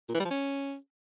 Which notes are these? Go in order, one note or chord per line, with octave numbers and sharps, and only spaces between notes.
A#2
E3
G3
F3
C#4